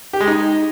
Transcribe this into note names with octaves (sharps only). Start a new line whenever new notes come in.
G4
G#3
D#4